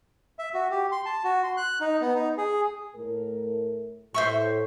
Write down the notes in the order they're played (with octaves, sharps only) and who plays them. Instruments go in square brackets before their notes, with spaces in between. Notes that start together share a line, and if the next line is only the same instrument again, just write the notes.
[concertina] E5
F#4
G4
C6
A5
F#4
C6
F#6
D#4
B3
D#4
G#4
[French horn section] A2 A3 A#4
[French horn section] A2 [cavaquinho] C5 E5 C#6